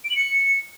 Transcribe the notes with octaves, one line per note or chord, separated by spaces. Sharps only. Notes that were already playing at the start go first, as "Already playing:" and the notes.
D7
F#7
C#7